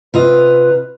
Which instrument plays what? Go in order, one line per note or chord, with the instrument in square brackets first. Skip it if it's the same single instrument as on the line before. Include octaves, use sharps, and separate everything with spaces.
[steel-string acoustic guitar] C3 F4 D#5 [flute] B4